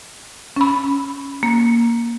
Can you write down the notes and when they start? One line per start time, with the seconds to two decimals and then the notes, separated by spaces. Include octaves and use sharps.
0.56 C#4 B5
1.43 A#3